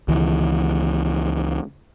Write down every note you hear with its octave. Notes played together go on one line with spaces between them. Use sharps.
C#2 D#3 E3